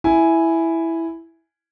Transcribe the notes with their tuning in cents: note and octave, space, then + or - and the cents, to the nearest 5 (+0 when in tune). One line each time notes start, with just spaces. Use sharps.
E4 +0 G#5 +0